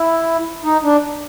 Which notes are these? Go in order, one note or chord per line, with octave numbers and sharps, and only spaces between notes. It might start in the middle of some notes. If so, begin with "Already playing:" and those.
Already playing: E4
D#4
D4